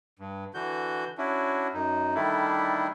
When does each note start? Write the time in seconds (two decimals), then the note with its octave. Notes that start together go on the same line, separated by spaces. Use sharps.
0.19 G2
0.54 D3 E3 F#4 G6
1.18 C#4 D4 E4 F#4
1.73 F#2 D#4
2.15 D3 D#3 G3 A3 D4 E4